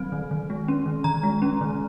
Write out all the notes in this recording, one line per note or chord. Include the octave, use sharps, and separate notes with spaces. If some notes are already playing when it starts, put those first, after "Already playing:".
Already playing: D#3 F#3 C4
D#3
D#3
G#3
C#4
D#3
D#3 A#5
G#3
C#4
D#3